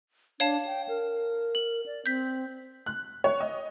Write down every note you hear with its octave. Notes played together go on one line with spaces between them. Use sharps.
D4 C#5 F5 A5
G5
A#4
F#7
D5
C4 G6 B6
F#6
C#5
D#5